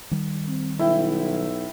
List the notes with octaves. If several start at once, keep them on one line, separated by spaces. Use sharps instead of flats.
D#3 G3
C4
B1 E4 G5